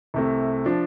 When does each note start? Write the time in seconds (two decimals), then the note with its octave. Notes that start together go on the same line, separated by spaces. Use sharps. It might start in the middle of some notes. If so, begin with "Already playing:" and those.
0.14 C2 C3 A3
0.66 F3 D4